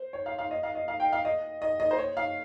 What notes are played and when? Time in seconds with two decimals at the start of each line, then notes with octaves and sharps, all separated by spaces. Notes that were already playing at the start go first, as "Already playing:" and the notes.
Already playing: C5
0.13 C#5
0.26 F5
0.39 F5
0.51 D#5
0.63 F5
0.75 D#5
0.88 F5
1.00 G5
1.13 F5
1.25 D#5
1.62 D#5
1.80 D#5
1.91 C5
1.98 C#5
2.17 F5